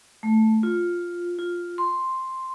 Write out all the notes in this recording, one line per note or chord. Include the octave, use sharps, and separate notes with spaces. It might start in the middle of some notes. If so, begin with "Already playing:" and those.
A3
F4
F4
C6